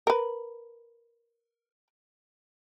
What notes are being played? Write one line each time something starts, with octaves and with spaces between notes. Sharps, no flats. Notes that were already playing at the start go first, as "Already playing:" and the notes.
A#4 B4